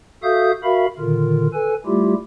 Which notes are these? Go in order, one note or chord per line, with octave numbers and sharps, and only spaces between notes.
F#4 A4 E5 F5 D#6 G6
F#4 A#4 E5 F5 B5
A#2 D3 D#3 F4 A#4
A4 B4 G#5
G3 A3 E4 F4 G4